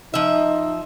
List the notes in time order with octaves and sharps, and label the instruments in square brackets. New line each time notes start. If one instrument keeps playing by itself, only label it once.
[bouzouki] F3 E5 [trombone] D#4